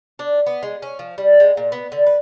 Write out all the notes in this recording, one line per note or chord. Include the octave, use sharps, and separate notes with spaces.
D4
B3
G#3
C#4
F3
G3
G#3
A#2
B3
D3
B4